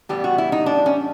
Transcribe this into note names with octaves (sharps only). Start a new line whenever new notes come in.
A2 E3 G3 B3 G4
F#4
E4
D#4
D4
C#4